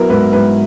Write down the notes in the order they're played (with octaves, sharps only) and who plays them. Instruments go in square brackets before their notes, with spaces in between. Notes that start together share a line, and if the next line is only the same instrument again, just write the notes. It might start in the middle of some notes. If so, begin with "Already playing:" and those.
Already playing: [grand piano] F#3 B3 [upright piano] E4 A#4
[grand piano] G#2 [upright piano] B4
[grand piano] G#2 [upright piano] B4